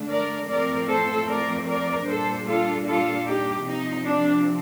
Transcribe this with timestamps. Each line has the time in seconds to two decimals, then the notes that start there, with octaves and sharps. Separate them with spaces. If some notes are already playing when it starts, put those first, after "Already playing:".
Already playing: D3 A3 D4
0.10 A#4 D5
0.49 A2 F3 A3 C4 A#4 D5
0.89 A4 C5
1.29 A#4 D5
1.68 A#4 D5
2.07 A#2 G3 A#3 D4 A4 C5
2.47 F4 A4
2.86 F4 A4
3.26 D#4 G4
3.66 C3 F3 C4 D#4
4.06 D4